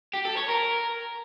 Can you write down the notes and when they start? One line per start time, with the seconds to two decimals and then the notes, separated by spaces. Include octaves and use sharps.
0.14 G4
0.25 A4
0.37 C#5
0.49 A#4